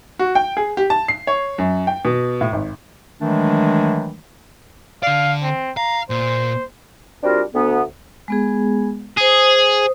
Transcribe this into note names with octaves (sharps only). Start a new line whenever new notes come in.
F#4
G5
G#4
G4
A5
C7
C#5
F#2
G5
B2
A2
G#1
D#3 E3 F#3 G#3 A3 D4
D3 D5 F5
C4
F5 A#5
A#2 C5
G3 C4 D4 F4 F#4 A#4
D2 B3
G#3 B3 G#4
G#4 C5 D#6